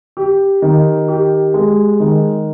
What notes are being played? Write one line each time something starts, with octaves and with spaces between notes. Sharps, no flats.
G4
D#3
G4
G#3
D#3